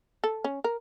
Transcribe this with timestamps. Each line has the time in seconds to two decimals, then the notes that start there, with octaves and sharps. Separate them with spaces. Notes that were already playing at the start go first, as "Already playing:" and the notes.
0.24 A4
0.44 C#4
0.64 A#4